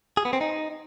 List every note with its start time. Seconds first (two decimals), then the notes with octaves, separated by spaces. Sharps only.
0.17 G#4
0.25 B3
0.33 C4
0.41 D#4